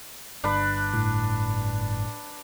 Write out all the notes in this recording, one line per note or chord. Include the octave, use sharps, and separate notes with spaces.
G1 D4 B4
A2